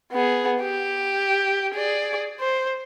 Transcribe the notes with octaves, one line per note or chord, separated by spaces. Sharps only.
B3 G#4
G4
G#4 D5
C5